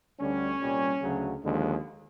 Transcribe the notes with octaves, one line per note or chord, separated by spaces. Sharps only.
D2 D3 G3 C#4
C2 A#2 G3
D2 C#3 F#3
D#2 D3 F3 G#3